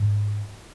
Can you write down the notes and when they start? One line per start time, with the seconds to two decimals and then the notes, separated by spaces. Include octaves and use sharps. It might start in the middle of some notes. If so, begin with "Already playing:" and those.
Already playing: G#2